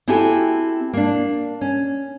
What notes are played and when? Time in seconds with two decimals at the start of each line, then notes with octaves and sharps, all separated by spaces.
0.08 C4 E4 F#4 G4 A4 G#5
0.93 A#3 D4
1.61 C#4